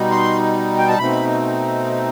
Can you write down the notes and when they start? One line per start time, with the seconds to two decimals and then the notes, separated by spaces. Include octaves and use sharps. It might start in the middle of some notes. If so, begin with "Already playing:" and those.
Already playing: B2 G3 D#4
0.11 C6
0.78 G5
0.88 A5
0.98 B2 A3 C4 D#4 B5